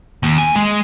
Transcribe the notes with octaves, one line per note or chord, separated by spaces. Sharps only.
D#2
G#5
G#3